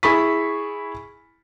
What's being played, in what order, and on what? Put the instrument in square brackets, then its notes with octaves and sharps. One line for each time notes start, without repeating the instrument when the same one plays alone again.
[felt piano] E4 G#4 B5 C#6 B6